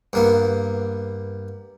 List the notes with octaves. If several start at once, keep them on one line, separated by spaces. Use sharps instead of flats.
G2 A#3 B3